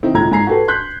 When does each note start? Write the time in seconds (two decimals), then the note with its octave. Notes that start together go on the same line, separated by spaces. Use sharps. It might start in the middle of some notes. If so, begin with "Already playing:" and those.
0.03 D#3 C4 D#4 E4
0.14 C#2 A2 D#4 A#5 G#6
0.31 G#2 G#5 A#5 C7
0.47 F#4 G4 A4 B4
0.68 C6 F#6 G6 B6